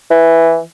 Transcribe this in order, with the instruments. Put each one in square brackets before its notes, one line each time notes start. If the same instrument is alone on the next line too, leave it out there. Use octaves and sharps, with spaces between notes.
[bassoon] E3